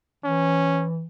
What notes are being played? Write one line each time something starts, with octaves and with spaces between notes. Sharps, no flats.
E3 C#4